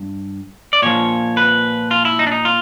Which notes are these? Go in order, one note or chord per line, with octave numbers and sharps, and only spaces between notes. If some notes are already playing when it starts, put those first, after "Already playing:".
Already playing: G2
D5
A#2 F3 C#5
B4
F4
E4
D#4
D4
D#4
F4